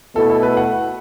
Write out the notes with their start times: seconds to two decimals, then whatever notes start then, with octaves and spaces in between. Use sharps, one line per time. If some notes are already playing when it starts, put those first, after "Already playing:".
0.15 B2 A3 E4 A4
0.30 A4
0.43 B4
0.57 F#5